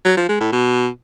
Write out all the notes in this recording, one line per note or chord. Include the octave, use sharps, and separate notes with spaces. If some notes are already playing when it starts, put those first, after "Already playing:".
F#3
F3
G#3
A2
B2